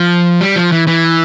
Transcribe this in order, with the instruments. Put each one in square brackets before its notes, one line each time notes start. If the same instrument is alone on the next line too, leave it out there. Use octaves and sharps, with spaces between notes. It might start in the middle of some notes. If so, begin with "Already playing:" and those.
Already playing: [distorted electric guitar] F3
G3
F3
E3
E3